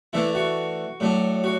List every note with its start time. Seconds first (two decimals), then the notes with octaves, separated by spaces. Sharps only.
0.13 E3 A3 D4 E4
0.35 F#4
1.00 A2 F#3 D4
1.44 F#4